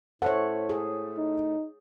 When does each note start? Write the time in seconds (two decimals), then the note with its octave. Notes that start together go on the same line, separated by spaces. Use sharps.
0.22 A2 A4 C5 C#5 E5 F#5
0.69 G#4
1.17 D#4